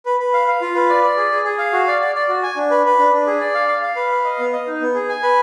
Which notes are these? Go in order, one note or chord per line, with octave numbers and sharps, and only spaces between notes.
B4
B4
F5
F5
F4
B4
D5
D5
G#4
G#4
G#4
F5
F#4
D5
D5
D5
F#4
G#5
D4
B4
B4
D4
D4
G#4
D5
F5
F5
F5
B4
F5
D#5
B3
D#5
D#4
B3
G#4
G#5
B4